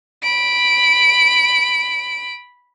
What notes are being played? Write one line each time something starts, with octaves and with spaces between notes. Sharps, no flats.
B5 D7